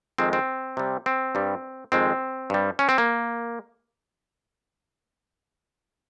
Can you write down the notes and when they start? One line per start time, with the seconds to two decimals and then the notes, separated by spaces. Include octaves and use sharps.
0.18 F2 D#3 G#3 C4
0.33 C4
0.77 C3 G3
1.06 C4
1.35 G2 G3
1.92 F2 D#3 G#3 C4
2.50 G2 G3
2.79 C#4
2.89 C4
2.98 A#3